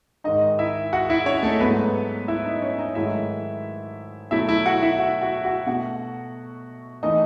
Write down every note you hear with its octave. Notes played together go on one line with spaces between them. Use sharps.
G#2 D#3 G#3 D#4 D#5
E4 E5
F#4 F#5
E4 E5
C#4 C#5
A3 A4
G#2 F#3 A3 B3 B4
E4 E5
D#4 D#5
C#4 C#5
D#4 D#5
G#2 D#3 F#3 A3 E4 E5
B2 F#3 A3 E4 E5
E4 E5
F#4 F#5
E4 E5
F#4 F#5
F#4 F#5
F#4 F#5
B2 A3 F#4 F#5
E3 A3 D#4 D#5